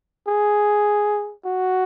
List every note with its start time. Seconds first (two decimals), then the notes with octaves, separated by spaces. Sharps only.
0.28 G#4
1.45 F#4